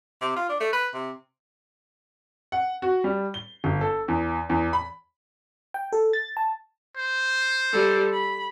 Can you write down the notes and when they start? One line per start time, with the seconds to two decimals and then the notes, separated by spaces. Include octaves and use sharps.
0.21 C3
0.36 F4
0.49 D4
0.60 A3
0.73 B4
0.94 C3
2.52 F#5
2.82 F#4
3.04 G3
3.34 G7
3.64 G1
3.81 A4
4.08 E2
4.50 E2
4.73 B5
5.74 G5
5.92 A4
6.13 A6
6.37 A5
6.97 C5
7.73 G3 A4
8.13 B5